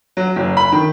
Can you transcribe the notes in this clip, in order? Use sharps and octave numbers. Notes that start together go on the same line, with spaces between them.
F#3
F#1
B5
D#3